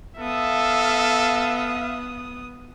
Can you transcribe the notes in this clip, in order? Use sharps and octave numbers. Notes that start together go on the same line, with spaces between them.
B3 A4 E5 F5 D#6